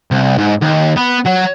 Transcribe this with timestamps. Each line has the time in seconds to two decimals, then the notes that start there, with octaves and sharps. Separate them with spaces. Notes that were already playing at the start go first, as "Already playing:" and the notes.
0.11 C2
0.38 G#2
0.62 D#2
0.97 B3
1.26 F#3